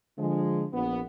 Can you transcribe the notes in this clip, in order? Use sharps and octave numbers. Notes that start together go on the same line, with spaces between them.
D3 F3 G#3
A#1 B3